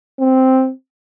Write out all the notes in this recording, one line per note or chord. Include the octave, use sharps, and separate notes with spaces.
C4